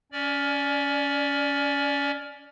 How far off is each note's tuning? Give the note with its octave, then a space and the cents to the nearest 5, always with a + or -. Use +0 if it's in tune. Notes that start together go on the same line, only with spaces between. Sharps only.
C#4 +25 D5 +0